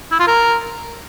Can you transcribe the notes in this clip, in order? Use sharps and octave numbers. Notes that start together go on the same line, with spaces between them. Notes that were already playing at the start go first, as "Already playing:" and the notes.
E4
F4
A#4